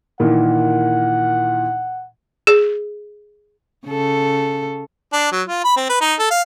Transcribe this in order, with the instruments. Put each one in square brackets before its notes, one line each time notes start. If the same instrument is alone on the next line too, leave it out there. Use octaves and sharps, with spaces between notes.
[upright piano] A#2 D#3 E3 [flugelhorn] F#5
[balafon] G#4
[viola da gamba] C#3 A4
[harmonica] D4
F#3
F4
B5
C4
B4
D#4
A4
F5